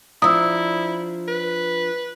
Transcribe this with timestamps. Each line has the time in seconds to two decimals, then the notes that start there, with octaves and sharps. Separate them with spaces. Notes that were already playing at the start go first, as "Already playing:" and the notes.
0.22 F3 D4 E4 A#5 D#6 E6
1.28 B4